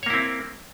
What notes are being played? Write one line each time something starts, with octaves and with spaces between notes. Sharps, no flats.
A#3 C4 E4 C#5